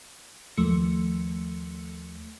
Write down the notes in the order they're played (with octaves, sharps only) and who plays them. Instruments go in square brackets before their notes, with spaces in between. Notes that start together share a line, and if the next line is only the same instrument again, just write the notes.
[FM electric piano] D#2 F3 A3 C#7